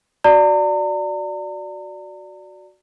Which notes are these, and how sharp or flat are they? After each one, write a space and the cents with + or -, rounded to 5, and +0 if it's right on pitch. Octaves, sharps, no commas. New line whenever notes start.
F#4 +0 D5 +0 A#5 -40